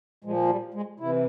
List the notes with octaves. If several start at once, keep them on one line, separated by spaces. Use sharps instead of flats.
A#2 F3 G#3
G3
G#3
C3 E3 E4